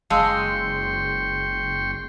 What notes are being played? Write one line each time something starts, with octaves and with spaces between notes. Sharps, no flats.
F#1 G#3 F5 G5 A5 C6 C#6 E6